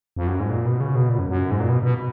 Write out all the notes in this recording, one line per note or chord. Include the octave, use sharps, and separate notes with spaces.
F2
F#2
G#2
A#2
B2
C#3
B2
A#2
F#2
F#2
G#2
A#2
B2
B2